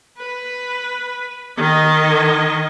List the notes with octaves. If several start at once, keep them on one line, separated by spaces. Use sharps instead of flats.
B4
D#3 D#5